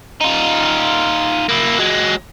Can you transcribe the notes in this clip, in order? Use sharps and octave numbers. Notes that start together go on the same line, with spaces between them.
D#4 F4
A#3 E4
F#3 G#3